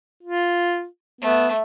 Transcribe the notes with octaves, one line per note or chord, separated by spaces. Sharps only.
F4
A3 B3